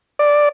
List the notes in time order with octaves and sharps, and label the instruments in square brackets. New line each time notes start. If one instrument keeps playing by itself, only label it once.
[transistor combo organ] D5